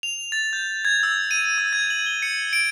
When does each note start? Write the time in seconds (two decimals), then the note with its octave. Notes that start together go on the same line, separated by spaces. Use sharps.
0.03 F7
0.32 A6
0.53 G6
0.85 G#6
1.03 E6
1.31 D#7
1.58 E6
1.73 G#6
1.90 F#7
2.06 G7
2.22 C#7
2.53 D7